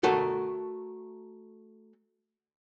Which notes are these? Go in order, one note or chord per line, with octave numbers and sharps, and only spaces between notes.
A3 F#4 A4 A#4